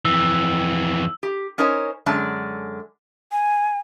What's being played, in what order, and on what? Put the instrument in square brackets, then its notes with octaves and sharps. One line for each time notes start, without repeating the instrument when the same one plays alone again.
[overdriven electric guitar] F2 E3 [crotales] E6
[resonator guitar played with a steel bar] G4
C#4 D#4 A#4 C5 C#5 G#5
F#2 D3 G#3 D5 A5
[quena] G#5